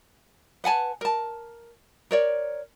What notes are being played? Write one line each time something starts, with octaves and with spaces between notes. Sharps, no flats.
B4 F#5 G#5 A5
A#4 A5
A#4 C#5 D5